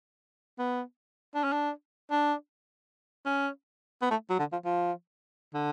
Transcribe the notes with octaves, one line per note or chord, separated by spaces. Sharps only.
B3
D4
C#4
D4
D4
C#4
B3
A3
F#3
D3
F3
F3
D3